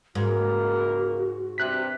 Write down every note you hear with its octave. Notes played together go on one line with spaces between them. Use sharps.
C#2 G#2 A#3 F#4 A#4
G2 C3 F#6 B6